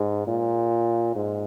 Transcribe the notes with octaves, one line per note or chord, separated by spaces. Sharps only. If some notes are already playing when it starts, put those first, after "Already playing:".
Already playing: G#2
A#2
G#2